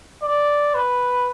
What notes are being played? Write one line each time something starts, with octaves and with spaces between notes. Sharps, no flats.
D5
B4